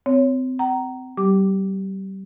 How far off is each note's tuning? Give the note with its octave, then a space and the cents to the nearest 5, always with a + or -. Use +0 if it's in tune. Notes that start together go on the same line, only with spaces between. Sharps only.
C4 -30 C#5 +0
F#5 +45 A#5 +0
G3 -35 G4 -5 D6 +0